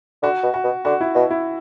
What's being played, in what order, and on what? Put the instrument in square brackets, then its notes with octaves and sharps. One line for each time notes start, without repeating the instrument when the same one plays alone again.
[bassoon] D3 [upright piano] F#4
[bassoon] B2
[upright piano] F#4
[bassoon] B2
[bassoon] D3 [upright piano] F#4
[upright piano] E4
[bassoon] B2 [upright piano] F#4
[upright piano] E4